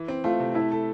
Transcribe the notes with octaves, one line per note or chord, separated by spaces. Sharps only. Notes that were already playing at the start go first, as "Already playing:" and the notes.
Already playing: E3
C4
A3 F4
C3
A3 E4
A4